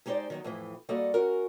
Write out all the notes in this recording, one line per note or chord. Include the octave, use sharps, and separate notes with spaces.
G#3 D#4 G4 G#4 C5 D5
D#3 F#3 B3
F2 A2 E3
G3 A#3 F#4 A4 D5 D#5
C#4 F#4 A#4